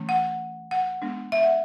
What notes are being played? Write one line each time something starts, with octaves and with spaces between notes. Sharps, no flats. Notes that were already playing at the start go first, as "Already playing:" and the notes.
Already playing: E3 A3 C#4
F#5
F#5
G#3 B3 D4
E5
F#5